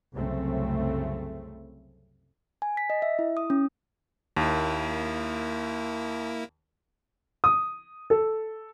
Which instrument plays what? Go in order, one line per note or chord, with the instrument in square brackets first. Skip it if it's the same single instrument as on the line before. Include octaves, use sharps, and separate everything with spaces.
[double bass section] C2 F#2 C#3 A3 C4
[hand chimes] G#5
B6
D#5
E5
E4
D#6
C#4
[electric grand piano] D#2 [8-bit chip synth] A#3 E4
[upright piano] D#6
A4